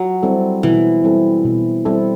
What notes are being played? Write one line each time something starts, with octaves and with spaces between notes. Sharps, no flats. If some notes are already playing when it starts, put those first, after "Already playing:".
Already playing: F#3
G3 C4 E4 A4
B2 E3
G3 C4 E4 A4
B2
G3 C4 E4 A4